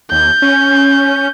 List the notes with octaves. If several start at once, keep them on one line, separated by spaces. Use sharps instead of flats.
D#2 G6
C#4